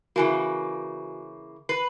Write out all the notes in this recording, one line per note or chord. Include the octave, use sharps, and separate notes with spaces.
C#3 E3 A#3 F#4 G#5
B4 C7